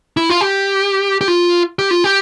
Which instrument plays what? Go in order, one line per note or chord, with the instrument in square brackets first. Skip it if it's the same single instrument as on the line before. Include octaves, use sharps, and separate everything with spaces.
[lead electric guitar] E4
F4
G4
G4
F4
G4
F4
G4